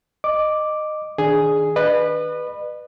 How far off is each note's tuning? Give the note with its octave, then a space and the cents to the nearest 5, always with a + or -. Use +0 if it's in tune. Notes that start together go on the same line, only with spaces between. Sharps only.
D#5 -15 D6 +0
D#3 +5 D4 +5 G#4 +0
B4 +0 D#5 -45 B5 +0